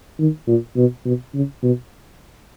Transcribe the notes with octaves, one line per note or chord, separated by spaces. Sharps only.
D#3
A#2
B2
B2
C#3
B2